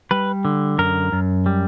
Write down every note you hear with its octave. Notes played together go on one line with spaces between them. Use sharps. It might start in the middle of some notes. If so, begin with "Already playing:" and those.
G3 B4
D3
F#2 A#4
F#2
G3